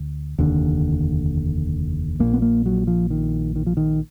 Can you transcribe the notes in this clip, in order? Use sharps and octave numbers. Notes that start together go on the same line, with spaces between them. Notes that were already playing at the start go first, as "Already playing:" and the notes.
Already playing: D2 D3
F1 D#2 D3
A#1 A#2 A#3
B3
A#3
F#3
F3
D#3
D#3
F3
D#3